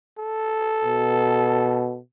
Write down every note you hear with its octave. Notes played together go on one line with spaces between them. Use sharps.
A4
B2